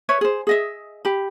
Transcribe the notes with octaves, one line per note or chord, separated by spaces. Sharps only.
B4 C#5 E5
G#4 C5
G#4 D#5 E5
G4 B5